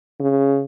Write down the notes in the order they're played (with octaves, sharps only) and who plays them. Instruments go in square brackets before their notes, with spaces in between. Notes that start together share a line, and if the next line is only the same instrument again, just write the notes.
[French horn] C#3